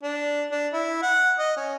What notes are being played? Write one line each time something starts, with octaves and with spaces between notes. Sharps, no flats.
D4
D4
E4
F#5
D#5
C#4